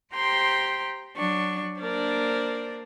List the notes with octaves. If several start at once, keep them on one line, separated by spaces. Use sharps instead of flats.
G4 C5 G5 A#5 C6
F#3 D4 C#6
A#3 D4 A#4 C5 D5